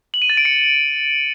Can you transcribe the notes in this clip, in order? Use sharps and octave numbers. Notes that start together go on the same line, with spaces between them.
F#7
D#7
A6
D7
C#7